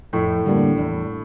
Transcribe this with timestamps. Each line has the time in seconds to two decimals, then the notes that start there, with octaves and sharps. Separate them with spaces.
0.13 F2 A2 A3
0.45 D3 G3 A#3 D4
0.78 E2